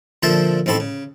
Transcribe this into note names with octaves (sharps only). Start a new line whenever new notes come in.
A#2 D3 F3 C5 E5 A5
A1 G#2 C4 A4 B5 C#6
C#3